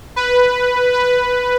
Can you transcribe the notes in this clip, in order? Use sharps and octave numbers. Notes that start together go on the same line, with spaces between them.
B4
B4